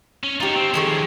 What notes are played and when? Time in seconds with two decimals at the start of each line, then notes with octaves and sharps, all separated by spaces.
0.24 C#4
0.40 D#4 F4 G4 C#5
0.56 C4
0.74 D#3 F3 G#4 A4 C#5